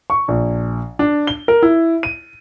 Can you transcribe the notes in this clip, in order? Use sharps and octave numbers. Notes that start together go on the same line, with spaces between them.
C#6
A#1
D4
G7
A#4
E4
D#7